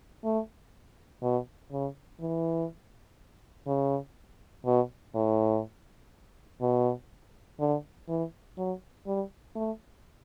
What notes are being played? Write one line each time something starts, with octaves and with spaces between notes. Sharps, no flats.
A3
B2
C#3
E3
C#3
B2
A2
B2
D3
E3
F#3
G3
A3